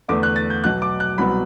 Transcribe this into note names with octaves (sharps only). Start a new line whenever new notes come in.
E2 D3 A3 D6
F#6
A6
G6
B1 B2 F#3 F#6
D6
F#6
C2 B2 F#3 B3 B5